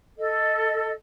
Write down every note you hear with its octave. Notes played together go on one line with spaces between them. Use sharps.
A4 D#5